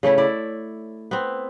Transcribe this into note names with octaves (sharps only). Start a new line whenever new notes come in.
C#3 A3 C#4 E4
E4 D5
B3 C4